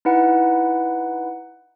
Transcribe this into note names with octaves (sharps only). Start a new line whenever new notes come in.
D#4 E4 B4 F#5